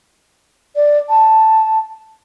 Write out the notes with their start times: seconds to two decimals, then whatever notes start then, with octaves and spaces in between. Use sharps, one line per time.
0.76 D5
1.09 A5